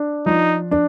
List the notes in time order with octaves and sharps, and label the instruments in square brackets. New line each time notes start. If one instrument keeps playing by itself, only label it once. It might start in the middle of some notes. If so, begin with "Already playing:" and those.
Already playing: [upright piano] D4
[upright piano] F3 [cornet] D#4
[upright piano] D4